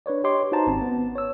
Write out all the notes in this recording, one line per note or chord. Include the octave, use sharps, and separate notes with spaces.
D4 B4 C#5 D5
G4 C#5 D#5 C6 D6
D#4 F#4 B4 C5 A5 A#5
G#1 C4 C#4 A5
B3
C#5 E6